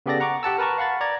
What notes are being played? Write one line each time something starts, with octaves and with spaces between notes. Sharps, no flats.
C#3 B3 G4 A4 D5 A#6
F#5 A#5 C#6 D6
G4 F#5 A5 E6
A#4 B4 A5 A#5 C#6
F5 F#5 B5 A6
D5 A#5 G#6